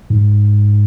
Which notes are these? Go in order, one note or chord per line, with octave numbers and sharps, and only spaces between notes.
G#2